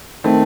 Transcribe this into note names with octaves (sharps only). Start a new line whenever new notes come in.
D#3 A3 C4